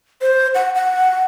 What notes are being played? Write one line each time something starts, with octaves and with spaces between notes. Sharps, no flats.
C5
F#5
F#5